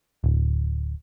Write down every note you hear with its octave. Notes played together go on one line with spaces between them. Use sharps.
D1